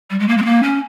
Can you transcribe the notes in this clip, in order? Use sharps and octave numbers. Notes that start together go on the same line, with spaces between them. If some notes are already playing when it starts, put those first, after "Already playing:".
G3
G#3
A#3
G#3
C4
A#3
C#4